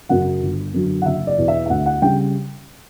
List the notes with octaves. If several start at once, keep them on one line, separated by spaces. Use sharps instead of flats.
F#2 C#3 F#3 F#5
G1
F#2 D3 F#3
F#5
F#1 E5
D5
E2 B2
E5
E5
D2 F#5
F#5
C#3 G3 G5